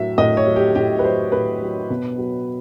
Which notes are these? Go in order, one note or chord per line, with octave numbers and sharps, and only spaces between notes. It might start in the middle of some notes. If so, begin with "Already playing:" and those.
Already playing: A2 F#3 E5
A2 D#5
C#5
F#3
G4
A2 G4
B4
F#3 C5
A2 B4
F#3
B2
F#3